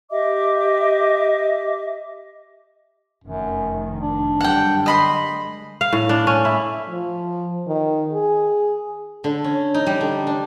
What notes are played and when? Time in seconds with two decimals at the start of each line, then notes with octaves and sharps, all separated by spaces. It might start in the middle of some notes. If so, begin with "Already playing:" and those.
0.11 G4 D#5 E5 D6
3.24 F1 F#2 D#3
4.00 D4
4.41 F#2 D3 G3 F#5 G5
4.86 D#5 B5 C6
5.29 G#3
5.81 F5
5.93 A2
6.09 D4
6.27 C#4
6.45 E4
6.89 F3
7.67 D#3
8.13 G#4
9.24 D3
9.44 C#4
9.74 D#4
9.86 G3
10.01 D3
10.27 D4